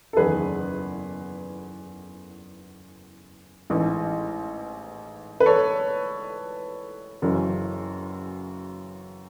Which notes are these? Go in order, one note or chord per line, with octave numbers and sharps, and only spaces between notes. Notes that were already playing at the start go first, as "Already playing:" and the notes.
A4
F#1 E2 D#3 G#4 B4
A1 G#2 E3
B4
A4 C#5
F#1 F#2 C#3 E3